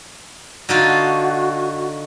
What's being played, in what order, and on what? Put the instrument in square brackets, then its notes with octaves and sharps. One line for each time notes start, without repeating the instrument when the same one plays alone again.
[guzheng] D3 D#4 F4 [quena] F#4